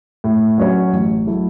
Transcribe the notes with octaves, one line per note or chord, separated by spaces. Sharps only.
A2
F#3 C#4 F#4 C#5
A1
F#3 A3 E4